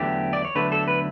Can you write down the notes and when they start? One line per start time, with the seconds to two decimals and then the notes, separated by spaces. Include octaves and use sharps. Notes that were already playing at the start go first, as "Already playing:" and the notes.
Already playing: E2 D3 F#3 A3 G4
0.33 D5
0.45 C#5
0.55 E2 D3 F#3 A3 B4
0.72 A4
0.88 B4